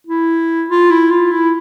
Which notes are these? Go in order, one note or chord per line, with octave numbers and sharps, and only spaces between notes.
E4
F4
E4
F4
E4